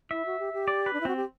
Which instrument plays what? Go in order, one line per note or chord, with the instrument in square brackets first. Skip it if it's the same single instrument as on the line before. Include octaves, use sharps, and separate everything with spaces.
[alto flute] E4 [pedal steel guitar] E5
[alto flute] F#4
G4
G4
[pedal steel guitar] D5
B4
[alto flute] D4
E4
[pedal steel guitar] C4 [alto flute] F#4
[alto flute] G4